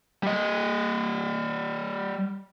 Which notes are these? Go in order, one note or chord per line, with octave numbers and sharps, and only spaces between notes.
G3 D#5